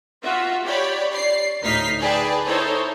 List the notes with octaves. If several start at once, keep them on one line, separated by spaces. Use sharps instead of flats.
F4 F#4 E5
G4 C#5 D5 B5
D5 C7
D2 A2 D#4 F6 B6 C7
G#4 B4 D5 G5 A5
D#4 E4 A4 C5 C#5